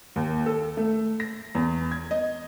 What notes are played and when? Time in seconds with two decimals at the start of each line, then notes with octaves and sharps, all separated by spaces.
0.16 D#2
0.46 A4
0.77 A3
1.20 A#6
1.55 E2
1.92 G#6
2.11 D#5